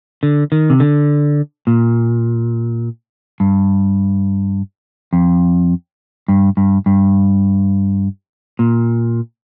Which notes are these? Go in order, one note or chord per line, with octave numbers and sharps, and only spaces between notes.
D3
D#3
C3
D3
A#2
G2
F2
G2
G2
G2
A#2